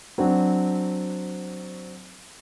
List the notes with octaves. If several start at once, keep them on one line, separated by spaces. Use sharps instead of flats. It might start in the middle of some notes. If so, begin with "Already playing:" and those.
F#3 C4 D4 F#4